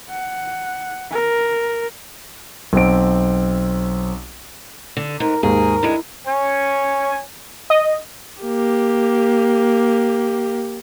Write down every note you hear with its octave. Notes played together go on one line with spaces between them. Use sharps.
F#5
A#4
B1 C4 D7
D3
G#2 A#4
D#2 G#2 D#4 G#4 A#4
D3 G#3 E4
C#5 G#5
D#5
A#3 G4